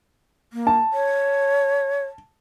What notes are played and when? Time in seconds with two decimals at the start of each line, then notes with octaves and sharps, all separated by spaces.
0.53 A#3
0.67 A5
0.93 C#5